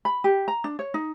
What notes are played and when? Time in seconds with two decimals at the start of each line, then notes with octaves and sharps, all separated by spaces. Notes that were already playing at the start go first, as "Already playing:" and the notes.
0.05 B5
0.24 G4
0.48 A#5
0.64 D4
0.79 C#5
0.94 D#4